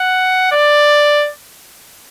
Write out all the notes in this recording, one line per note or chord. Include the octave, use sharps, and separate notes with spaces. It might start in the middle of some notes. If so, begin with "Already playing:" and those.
Already playing: F#5
D5